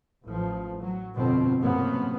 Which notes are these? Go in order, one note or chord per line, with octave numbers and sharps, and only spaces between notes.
A1 F3
F#3
G1 F2 B2 C4
F#2 A2 C3 A#3 B3